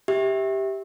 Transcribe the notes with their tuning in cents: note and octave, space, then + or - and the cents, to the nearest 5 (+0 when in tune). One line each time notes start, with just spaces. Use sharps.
G4 +0 E5 -15